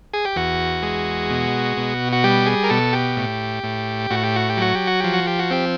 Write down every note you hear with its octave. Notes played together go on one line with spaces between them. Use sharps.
G#4
G4
E2 F#4
G#3
B2
B2
F#4
G3 G4
G#4
A#4
B2 A4
G4
A2
A2
A2 F#4
G4
F#4
G4
F#3 F#4
G4
F#4
F3 G4
F#4
G4
F#4
C4 G4